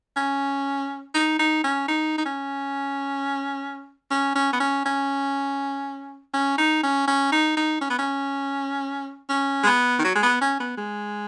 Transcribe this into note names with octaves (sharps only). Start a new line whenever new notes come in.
C#4
D#4
D#4
C#4
D#4
D#4
C#4
C#4
C#4
B3
C#4
C#4
C#4
D#4
C#4
C#4
D#4
D#4
C#4
B3
C#4
C#4
G#3
B3
D#3
F#3
G#3
B3
C#4
B3
G#3